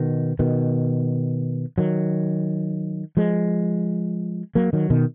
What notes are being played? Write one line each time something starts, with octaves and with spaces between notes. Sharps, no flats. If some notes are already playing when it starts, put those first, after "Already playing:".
Already playing: B2 D#3
B2 D#3
D#3 F#3
F3 G#3
F#3 A#3
D#3 F#3
B2 D#3